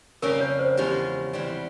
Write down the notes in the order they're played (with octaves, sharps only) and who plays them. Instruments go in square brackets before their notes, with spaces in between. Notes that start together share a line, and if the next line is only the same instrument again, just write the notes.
[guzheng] F2 C#3 G3 A#3 C#4 [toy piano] A#4
[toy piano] C#5
C5
[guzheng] E2 C#3 F3 G#3 C#4 [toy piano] G4
[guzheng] E2 C3 E3 G3 C4